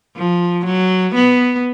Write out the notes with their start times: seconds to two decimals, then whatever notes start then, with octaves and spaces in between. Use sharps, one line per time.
0.17 F3
0.65 F#3
1.15 B3